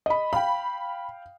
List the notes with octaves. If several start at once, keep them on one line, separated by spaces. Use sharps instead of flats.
D#5 B5
F5 G5 B5